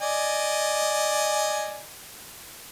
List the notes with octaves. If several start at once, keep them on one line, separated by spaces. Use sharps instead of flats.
D5 D#5 G#5